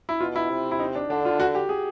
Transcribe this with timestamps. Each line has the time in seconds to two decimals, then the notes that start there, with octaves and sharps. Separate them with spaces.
0.09 E4
0.21 B2 F4
0.36 E4
0.50 C3
0.71 E4
0.79 D#4
0.95 D4
1.10 D3 D4
1.25 F4
1.40 F#4
1.55 G4
1.69 G#4